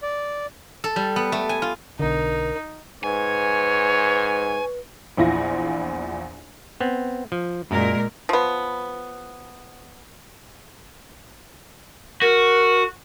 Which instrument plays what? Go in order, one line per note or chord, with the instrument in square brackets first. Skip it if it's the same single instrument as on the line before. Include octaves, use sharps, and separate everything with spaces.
[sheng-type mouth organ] D5
[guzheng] A4
G3
B3
A3
G#5
F4
[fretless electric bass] B1 D3 [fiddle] D#4 [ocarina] A#4
[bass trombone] G#2 [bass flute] B4 [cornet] C#5 [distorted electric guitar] G#5
[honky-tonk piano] A#1 E2 E4 F4 A#6
[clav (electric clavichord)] B3 C4
F3
[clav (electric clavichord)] F#2 [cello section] A#2 G#3 A#4
[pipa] F3 B3
[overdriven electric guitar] F#4 [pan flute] A#4